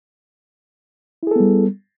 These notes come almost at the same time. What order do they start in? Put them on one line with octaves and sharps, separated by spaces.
E4 G#4 A4 B3 G3